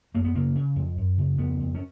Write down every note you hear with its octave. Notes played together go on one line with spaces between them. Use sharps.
F#2 A#3
B3
C#3 A#3
C#3
F2
F#2
C#3
F2 B3
F2
C#4